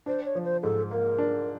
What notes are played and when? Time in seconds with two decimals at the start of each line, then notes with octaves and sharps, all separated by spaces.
0.06 D4 C5
0.25 C#5
0.35 F3
0.44 C5
0.63 G#2 A4
0.91 A#3 A#4
1.18 D4